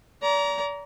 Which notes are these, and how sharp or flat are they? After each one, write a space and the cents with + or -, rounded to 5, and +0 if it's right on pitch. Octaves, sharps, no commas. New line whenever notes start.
D5 -35 A#5 +15